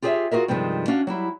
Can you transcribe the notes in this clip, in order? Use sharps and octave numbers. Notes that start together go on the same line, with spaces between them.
F4 G4 G#4 C#5 D5 E5
F4 F#4 G#4 A#4 E5
G2 C3 D#3 F3 G#3
C#4 D4 F#4 F5
F#3 G3 E4